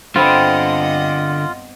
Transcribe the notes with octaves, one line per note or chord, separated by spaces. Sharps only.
G2 D3 B3 C4 F4 D#5 F#5 G5